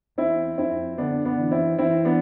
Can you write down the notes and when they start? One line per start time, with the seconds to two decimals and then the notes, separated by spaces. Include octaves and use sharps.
0.18 E2 C4 E4
0.58 F2 C4 E4
0.98 D3 B3 D4
1.25 B3 D4
1.39 E3
1.51 C4 E4
1.78 E3 C4 E4
2.05 B3 D4